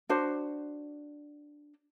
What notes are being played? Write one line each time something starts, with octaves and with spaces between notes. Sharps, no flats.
D4 F#4 C5